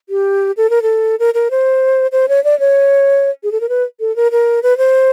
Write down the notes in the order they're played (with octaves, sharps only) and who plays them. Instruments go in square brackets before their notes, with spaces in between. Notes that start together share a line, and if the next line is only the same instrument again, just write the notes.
[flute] G4
A4
A#4
A4
A#4
A#4
C5
C5
C#5
D5
C#5
G#4
A4
A#4
B4
A4
A#4
A#4
B4
C5